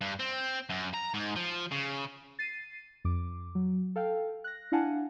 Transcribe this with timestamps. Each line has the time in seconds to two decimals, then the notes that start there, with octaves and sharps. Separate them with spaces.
0.01 G2
0.19 C4
0.69 F#2
0.94 A#5
1.14 G#2
1.36 F3
1.71 C#3
2.39 A6 C7 D#7
3.05 F2 D6
3.55 F#3
3.96 A4 F5 G5
4.44 F#6 A#6
4.72 D4 E4 F5 F#5 G#5 A5